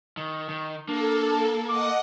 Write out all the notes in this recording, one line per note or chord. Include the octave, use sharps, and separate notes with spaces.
D#3
D#3
A#3 D4 A4
D#5 F#5 D6 D#6